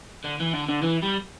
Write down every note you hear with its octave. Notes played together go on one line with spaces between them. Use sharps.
D3
E3
D3
D3
E3
G3